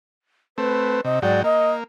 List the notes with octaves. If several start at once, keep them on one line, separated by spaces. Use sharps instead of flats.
A3 C4 B4
C3 D#5
G#2 F#3 D5 G5
A#3 D#5